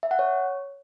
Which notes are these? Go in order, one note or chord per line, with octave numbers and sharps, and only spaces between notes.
E5
F#5
C#5